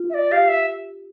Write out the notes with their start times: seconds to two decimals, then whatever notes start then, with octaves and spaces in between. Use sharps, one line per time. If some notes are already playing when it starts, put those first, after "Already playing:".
Already playing: F4
0.10 E5
0.14 D5
0.32 G4 F5
0.48 E5